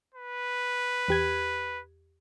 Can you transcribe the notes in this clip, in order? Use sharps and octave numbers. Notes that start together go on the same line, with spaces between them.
B4
E2 G4 G#6